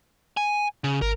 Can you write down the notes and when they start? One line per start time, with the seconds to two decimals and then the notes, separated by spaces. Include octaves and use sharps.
0.37 G#5
0.84 C#3
1.02 G#1 A#4